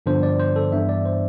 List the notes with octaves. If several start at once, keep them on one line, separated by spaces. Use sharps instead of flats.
G2 D3 F3 B3 D4 C5
D5
C5
A4
G2 E3 B3 D4 E5
D5
C5